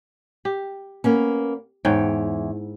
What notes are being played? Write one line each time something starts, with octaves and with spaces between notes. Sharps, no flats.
G4
A#3 B3 C#4
E2 G#2 C#5 G5